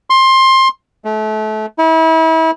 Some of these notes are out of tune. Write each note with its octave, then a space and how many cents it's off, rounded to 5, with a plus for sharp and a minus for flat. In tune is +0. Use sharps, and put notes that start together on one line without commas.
C6 +20
A3 -30
E4 -35